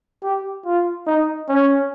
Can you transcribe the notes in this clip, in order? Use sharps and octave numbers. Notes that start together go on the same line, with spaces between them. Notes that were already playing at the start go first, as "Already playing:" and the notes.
G4
F4
D#4
C#4